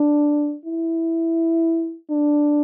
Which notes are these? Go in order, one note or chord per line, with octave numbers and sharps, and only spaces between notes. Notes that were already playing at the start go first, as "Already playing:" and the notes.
Already playing: D4
E4
D4